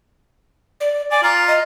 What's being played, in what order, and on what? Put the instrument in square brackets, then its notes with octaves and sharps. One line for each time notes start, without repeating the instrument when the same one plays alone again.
[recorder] D5
[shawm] D5 [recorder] G#5
[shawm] F4 [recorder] A#5
[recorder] D#5